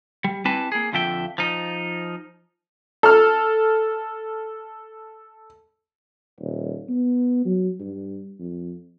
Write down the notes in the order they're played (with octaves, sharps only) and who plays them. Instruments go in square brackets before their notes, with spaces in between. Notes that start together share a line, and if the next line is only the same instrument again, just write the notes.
[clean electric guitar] G3
C4 E4 G4 B4 G#5 A5
A#3 G#4
F2 D3 F3 E5 G5
F3 D#4
[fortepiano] A4 F6
[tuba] D#1
B3
F#3
G2
F2